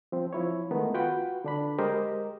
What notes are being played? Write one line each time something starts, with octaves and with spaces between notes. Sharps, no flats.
F3 C4
F3 E4 C#5
D#3 G#3 A3 B3 D#4
F4 F#4 B4 F#5 G5
D3 D4 B5
G#3 G4 A#4 C5 D#5